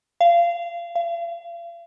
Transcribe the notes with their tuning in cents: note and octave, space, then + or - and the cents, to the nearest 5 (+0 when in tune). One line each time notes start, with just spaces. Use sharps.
F5 -25
F5 -40